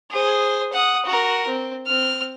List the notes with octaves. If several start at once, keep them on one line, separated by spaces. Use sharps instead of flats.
G#4 C5
F#5 D#6
F#4 A#4
C4
C4 F6